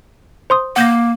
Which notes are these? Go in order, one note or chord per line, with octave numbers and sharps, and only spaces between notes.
C5 C6 D#6
A#3 F#5 G6 A#6